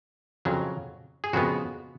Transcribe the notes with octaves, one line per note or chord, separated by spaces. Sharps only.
F2 C#3 F#3
G#4
F2 C#3 G#3 B3 F#4